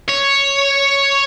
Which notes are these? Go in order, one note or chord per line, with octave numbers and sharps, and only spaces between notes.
C#5